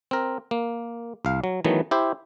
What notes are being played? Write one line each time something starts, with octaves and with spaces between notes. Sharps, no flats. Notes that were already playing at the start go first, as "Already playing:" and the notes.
C4 A#4
A#3
C2 F5
F#3
D#3 E3 F#3 A3 B3
E4 G4 C5